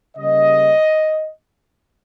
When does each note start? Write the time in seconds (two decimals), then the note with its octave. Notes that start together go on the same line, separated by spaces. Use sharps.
0.17 C#3 G3 A#3 D#5